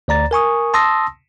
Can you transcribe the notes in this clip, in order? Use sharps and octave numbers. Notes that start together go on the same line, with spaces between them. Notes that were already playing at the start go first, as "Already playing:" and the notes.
D2 D5 A#5 A6
A#4 G#5 C#6 D#6
A5 C6 D#6 E6 A#6